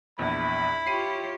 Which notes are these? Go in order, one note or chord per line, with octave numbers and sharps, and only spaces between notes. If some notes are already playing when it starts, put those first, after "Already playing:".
A#1 E2 E4 B5
F4 G4 C#5 C7 D#7